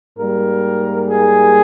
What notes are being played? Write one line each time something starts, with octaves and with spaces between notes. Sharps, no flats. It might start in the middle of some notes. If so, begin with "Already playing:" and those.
G#2 G3 A#3 A#4
G#4